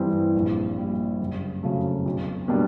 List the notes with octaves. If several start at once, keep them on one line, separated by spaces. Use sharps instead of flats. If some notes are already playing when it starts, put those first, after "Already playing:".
Already playing: G2 E3 G3 C4
A#1
A#2 G3
F#1
F2 C#3 F#3 A3
B1
B2 G3 A#3 D4